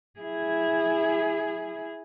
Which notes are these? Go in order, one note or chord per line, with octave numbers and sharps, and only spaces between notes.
E4 G#4